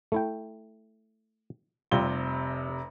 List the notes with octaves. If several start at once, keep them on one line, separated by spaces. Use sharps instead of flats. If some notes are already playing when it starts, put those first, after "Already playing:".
A3 E4 G5
F1 C3 G3 F4 G7